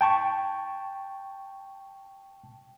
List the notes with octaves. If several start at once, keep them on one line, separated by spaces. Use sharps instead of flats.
G5 A5 C#6